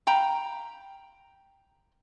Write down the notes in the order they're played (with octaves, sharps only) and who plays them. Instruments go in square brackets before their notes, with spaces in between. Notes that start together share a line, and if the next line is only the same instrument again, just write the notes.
[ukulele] F5 G5 A#5 B5